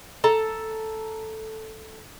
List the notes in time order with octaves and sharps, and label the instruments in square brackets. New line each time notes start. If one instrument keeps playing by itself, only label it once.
[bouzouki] A4 A#5